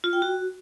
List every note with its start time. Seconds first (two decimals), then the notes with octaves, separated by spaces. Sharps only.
0.04 F4
0.13 G5
0.22 F#4